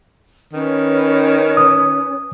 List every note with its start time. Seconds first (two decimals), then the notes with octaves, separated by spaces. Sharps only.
0.54 D#3 C#4 B4
1.57 D#6